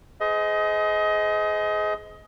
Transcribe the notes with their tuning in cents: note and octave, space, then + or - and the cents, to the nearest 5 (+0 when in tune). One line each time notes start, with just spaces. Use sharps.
G#4 +25 C5 -35 D#5 +25